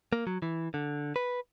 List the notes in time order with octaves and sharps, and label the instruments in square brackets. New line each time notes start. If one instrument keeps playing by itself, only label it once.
[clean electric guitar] A#3
F#3
E3
D3
B4